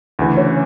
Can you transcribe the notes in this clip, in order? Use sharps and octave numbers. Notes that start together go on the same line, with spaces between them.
D2 C#3 E3
C#4